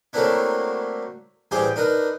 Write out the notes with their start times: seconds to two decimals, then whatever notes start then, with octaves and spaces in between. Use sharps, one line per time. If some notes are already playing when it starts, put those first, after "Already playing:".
0.13 F#3 A3 A#3 C4 D4 E4
1.51 A1 G2 C4 G4 G#4 G5
1.76 D4 D#4 A#4 B4